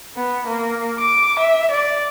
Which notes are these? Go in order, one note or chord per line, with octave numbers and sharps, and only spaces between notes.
B3
A#3
D6
E5
D5